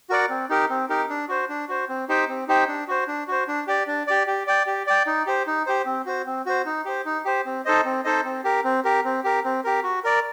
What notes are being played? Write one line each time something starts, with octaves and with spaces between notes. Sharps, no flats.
F#4 A#4 D5 F#5
C4
D#4 G4 A#4
C4
D#4 G4 A#4
D4
F#4 C5
D4
F#4 C5
C4
D#4 G4 C5 G5
C4
D#4 G4 C5 G5
D4
F#4 C5
D4
F#4 C5
D4
G4 D5
D4
G4 D5
G4
D5 G5
G4
D5 G5
D#4
G4 C5
D#4
G4 C5
C4
F#4 C5
C4
F#4 C5
D#4
G4 C5
D#4
G4 C5
C4
D#4 A4 C5 D#5
C4
D#4 A4 C5 D#5
C4
G4 A#4
C4
G4 A#4
C4
G4 A#4
C4
G4 A#4
F#4
A#4 D5